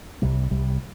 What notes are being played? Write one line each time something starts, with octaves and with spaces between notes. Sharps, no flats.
C2 C3 G3
C2 C3 G3